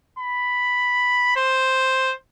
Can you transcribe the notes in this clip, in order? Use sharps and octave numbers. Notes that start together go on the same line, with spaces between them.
B5
C5